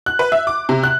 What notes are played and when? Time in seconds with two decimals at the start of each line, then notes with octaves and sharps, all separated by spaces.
0.06 F#6
0.19 B4
0.32 E5
0.47 D6
0.69 C3
0.83 F#6